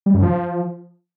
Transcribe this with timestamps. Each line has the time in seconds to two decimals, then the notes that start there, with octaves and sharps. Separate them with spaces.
0.06 G3
0.14 F#2
0.23 F3